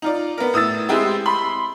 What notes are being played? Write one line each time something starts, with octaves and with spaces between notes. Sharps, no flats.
D#4 F4 D5
B3 A#4
A2 D#6 E6 A6
G#3 C4 E4 G4 G#4
B5 C6